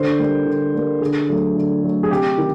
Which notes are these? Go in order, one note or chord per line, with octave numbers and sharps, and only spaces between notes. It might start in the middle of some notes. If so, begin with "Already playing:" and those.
Already playing: D3 C5
G3 A#3
D3
G3 A#3
D3 G#4
F#3 A3
D3
F#3 A3
G#4
C3 G4
D#3